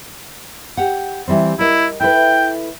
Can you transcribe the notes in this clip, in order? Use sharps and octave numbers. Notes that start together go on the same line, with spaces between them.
G4 F#5
E3 G3 C4
E4 A#4 D#5
E4 A4 B4 G5